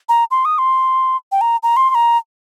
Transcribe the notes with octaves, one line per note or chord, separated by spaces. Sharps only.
A#5
C6
D#6
C6
G5
A#5
A#5
C6
C6
A#5